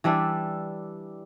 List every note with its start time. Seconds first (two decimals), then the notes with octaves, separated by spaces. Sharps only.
0.04 E3 G3 D4 E4